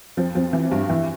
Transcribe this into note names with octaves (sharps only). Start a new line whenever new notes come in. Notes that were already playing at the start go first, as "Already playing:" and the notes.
F2 F3
F2 F3
E3
G2 G3
E3 E4